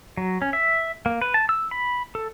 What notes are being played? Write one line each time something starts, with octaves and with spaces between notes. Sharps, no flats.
F#3
C#4
E5
A#3
B4
A5
E6
B5
A4